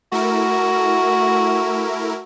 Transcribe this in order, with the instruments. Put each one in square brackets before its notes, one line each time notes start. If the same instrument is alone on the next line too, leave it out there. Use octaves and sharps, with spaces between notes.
[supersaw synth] A3 E4 A#4 [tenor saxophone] F#4